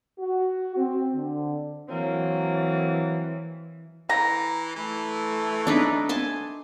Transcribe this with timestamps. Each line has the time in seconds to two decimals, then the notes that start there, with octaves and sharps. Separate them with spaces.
0.18 F#4
0.76 C4
1.14 D3
1.89 E3 F#3 A#3 C4
4.10 E3 A#5
4.76 E3 A3
5.67 D4 D#4 B4
6.09 G#5 A5 C6